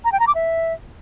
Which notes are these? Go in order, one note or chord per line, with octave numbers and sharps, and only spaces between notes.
A#5
G5
A#5
D6
E5